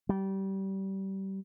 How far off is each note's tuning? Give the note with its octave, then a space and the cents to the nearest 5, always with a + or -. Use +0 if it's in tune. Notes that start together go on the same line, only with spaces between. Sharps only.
G3 -25